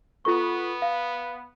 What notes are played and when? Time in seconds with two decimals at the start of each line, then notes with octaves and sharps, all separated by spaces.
0.25 B3 F4 A4 C#6
0.82 F5